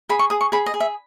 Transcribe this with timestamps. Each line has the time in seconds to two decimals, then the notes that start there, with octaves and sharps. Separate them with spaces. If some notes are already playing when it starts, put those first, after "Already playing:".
0.09 G#4 B5
0.19 C#6
0.30 G#4 D#6
0.41 C#6
0.52 G#4 B5
0.66 D#5
0.74 G#4
0.80 E5